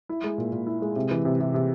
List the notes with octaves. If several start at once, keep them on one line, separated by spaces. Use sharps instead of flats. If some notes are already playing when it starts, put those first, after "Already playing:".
E4
G#3
A#2
A#2
E4
G#3
C3
E3
C3
C3
C3